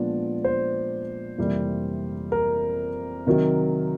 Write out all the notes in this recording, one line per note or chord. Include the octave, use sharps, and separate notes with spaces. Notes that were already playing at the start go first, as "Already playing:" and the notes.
Already playing: A#2 F3 G#3 B3 D4 D5
C5
F2 C3 E3 G3 A#3
A#4
C3 D#3 F#3